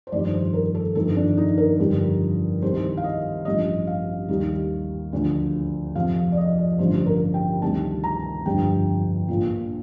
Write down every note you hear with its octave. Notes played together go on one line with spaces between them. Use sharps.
C5
G1 F2 D#3 G3 D5
C5
A#4
A4
G1 F2 D#3 A4
D4
D#4
A#4
G1 F2 D3 G3
C2 C3 D#3 G3 C5
F5
D#5
A1 G2 F3 D#5
F5
D#2 D#3 G3
D2 D3 F3
F2 C3 F3 F5
D5
D#5
D5
A1 G2 D3 F3 C5
A#4
G5
D2 C3 D#3 G3 A5
A#5
G1 F2 D3 G3 G5
A#1 A#2 F3